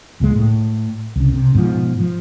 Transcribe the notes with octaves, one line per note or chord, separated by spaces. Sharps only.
D1 C#2 A#2 G#3
A2
C2 C#3
C3
G#2 B2 E3 F3
F3